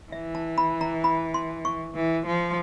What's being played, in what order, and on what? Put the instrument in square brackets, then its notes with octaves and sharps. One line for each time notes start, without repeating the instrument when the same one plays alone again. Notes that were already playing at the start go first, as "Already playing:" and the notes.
[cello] E3 [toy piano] E5
[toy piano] A5
B5
A#5
B5
C6
C#6
[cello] E3
F3